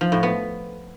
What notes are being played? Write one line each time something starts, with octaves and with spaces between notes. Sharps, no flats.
F3
A2
B3